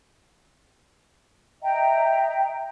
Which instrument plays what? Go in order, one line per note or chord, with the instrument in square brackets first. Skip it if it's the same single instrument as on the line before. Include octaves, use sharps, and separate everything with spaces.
[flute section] D#5 E5 G5 A#5